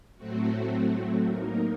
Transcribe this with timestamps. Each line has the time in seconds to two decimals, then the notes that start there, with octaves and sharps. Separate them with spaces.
0.17 A2 F#3 A3 C4 F#4
1.25 F#3 A#3 D#4 A#4